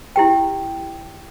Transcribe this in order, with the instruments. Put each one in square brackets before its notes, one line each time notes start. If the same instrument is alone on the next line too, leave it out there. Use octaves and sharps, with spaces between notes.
[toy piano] E4 G4 G5